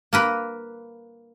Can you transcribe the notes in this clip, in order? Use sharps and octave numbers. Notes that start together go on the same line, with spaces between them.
A#3 A#4 B4